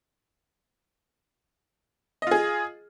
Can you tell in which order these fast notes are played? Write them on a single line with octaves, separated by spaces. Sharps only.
D#5 F4 G#4